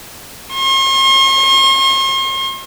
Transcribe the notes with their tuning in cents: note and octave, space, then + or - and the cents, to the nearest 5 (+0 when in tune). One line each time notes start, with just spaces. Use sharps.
C6 +45